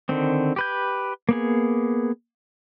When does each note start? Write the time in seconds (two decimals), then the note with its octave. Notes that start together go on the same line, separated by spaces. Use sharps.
0.09 D3 D#3 C4
0.56 G4 B4 G6
1.29 A#3 B3 G#4